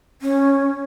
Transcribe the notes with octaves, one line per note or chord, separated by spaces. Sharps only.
C#4